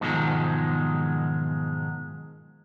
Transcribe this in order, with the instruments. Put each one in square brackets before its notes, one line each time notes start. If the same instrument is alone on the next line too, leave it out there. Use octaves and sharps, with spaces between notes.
[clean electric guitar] G#2 B2 D#3 F3 F#3 G#3